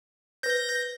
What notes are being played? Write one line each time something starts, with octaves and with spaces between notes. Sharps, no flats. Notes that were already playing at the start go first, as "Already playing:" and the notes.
B4 C5 G6 A#6